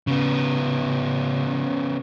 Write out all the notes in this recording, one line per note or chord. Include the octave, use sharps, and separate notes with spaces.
C#3 B3